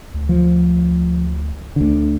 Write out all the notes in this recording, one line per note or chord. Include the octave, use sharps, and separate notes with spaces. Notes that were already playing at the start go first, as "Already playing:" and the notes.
D2
F3
D2 D3